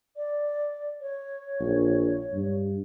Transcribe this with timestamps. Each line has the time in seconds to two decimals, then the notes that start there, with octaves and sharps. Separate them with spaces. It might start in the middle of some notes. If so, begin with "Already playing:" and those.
0.16 D5
1.00 C#5
1.60 A#1
2.33 G2